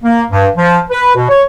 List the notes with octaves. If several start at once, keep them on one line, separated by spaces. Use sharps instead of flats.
A#3
G2
F3
B4
B2
C#5